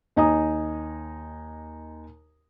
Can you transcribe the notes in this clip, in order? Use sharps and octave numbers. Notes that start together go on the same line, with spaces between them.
D#2 D#4 G#5 A#5 D#6